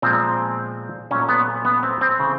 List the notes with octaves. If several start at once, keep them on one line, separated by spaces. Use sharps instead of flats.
A#2 F3 G#3 B3 C4
A#2 F#3 A3 C#4
B3
B3
C4
C4
C#3 E3 A3